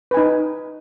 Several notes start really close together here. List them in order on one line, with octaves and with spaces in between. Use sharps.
B4 G#5 D#4